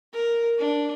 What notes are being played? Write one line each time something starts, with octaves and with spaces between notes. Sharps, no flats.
A#4
D4